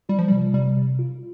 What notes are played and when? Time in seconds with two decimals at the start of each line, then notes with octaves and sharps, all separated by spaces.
0.09 G3 F4
0.19 F3
0.28 G3
0.31 C3
0.54 C3 G3
0.77 C3
0.99 F4